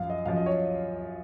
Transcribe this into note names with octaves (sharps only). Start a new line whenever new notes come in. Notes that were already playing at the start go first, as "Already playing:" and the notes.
Already playing: F#2 F3 F5
D#5
F#2 F3 F5
D#5
C#5